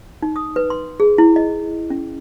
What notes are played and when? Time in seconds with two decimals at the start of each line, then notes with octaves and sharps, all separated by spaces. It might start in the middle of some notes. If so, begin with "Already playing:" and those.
0.22 D#4
0.36 D#6
0.56 B4
0.70 C6
1.00 G#4
1.18 E4
1.36 D#5
1.90 C#4